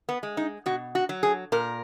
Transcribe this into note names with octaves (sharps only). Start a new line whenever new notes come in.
B3
G#3
D#4
B2 F#4
F#4
F#3
G#4
A#2 A#4